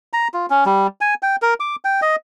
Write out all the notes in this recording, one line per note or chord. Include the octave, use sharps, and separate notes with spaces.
A#5
F4
C#4
G3
G#5
G5
A#4
D6
G5
D#5